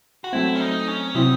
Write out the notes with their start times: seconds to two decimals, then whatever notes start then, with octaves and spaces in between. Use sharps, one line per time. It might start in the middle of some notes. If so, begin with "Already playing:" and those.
0.24 F#4
0.33 F#3 A3 C4 E4
0.55 C#4
0.60 D#4
0.88 C#4
1.15 C3 F#3 C4 D#4 E4